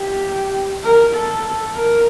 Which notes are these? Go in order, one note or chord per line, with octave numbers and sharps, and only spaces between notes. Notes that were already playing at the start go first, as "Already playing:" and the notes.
Already playing: G4
A#4
A4
A#4